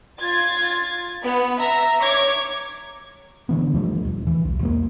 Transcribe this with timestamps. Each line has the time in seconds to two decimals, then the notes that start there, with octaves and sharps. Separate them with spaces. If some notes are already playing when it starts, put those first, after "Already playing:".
0.19 F4 G#6 A6
1.22 B3
1.59 E5 A#5
2.01 C#5 D6 G#6
3.49 D3 E3 B3
3.73 D#2 F3 G3 A3
4.05 D#1
4.27 E3
4.45 B1
4.61 E2 G3 A#3